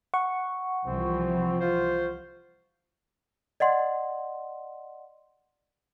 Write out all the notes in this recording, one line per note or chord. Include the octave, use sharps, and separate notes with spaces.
F#5 C#6
C2 E3 F3 C4
F4 C5
D5 D#5 F#5 C6